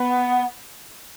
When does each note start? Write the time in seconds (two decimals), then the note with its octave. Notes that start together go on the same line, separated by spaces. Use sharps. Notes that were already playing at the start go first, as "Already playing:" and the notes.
Already playing: B3